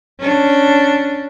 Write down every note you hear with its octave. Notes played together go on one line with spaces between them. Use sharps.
C#4 D4